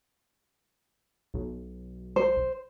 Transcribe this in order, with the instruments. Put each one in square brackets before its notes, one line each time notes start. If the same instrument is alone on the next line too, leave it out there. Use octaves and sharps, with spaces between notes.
[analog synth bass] B1
[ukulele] C5